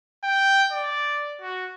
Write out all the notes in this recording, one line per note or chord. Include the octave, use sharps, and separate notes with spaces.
G5
D5
F#4